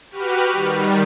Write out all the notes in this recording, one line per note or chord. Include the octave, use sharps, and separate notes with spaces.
F#4 G4 B4 F6
D#3 G3